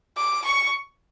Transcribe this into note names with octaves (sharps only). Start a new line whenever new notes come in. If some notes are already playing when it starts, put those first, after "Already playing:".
D6
C#6